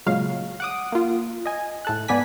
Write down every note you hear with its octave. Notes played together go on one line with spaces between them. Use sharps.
A#2 C#3 F#3 G#3 F5
F#5 D6 D#6
A#3 F4
D#5 G#5
A2 A4 F#6
G#2 B3 D5 G#5 B6